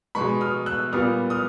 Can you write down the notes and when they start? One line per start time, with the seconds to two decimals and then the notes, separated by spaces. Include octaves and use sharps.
0.15 B2 G#3 B3 B5 C#6
0.41 D#6 F6
0.66 E6 F#6
0.92 A#2 G3 B3 D#6 F6
1.30 D#6 F6